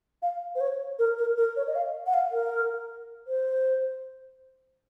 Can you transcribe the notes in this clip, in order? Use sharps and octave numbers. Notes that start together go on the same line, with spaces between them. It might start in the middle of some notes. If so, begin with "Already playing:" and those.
F5
C5
C#5
A#4
A#4
A#4
C#5
D#5
F5
F#5
F5
A#4
C5